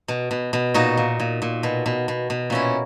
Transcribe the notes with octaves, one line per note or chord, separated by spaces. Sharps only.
B2
B2
B2
A#2 D#4 F#4
A#2
A#2
A#2
B2
B2
B2
B2
A#2 C#4 E4